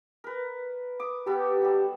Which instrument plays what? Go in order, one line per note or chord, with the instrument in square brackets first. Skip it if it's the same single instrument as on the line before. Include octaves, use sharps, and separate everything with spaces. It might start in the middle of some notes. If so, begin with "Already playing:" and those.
[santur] A#4 B4
D6 D#6
[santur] B3 A4 B5 [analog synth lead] G4
[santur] F#3 G3